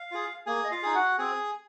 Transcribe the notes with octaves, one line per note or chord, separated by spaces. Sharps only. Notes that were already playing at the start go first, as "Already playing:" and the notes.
Already playing: F5
F4 G#4
A#3 G#4 G#5
D#5
F4 F5
D#4 G#4 G#5
F#4 F#5
C4 G#4 G#5